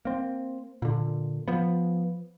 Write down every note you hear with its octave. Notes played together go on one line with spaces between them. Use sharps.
A#3 C4
A#2 D3
F3 B3